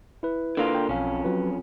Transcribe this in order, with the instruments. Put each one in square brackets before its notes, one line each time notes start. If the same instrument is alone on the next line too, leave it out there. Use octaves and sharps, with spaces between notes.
[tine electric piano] E4 B4
[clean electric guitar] D3 A#3 F4
[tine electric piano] G5
[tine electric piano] B1 F5 [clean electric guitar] F2 C#4
[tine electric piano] F#3 F4 B4